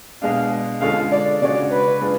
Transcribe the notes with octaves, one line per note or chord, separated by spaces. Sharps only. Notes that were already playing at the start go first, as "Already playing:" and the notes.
B2 G#3 D4 F5
D3 G#3 C#4 F4 A4 F5
D5
C#3 G#3 D4 F#4 C#5 D5
B4
G#3 D4 F4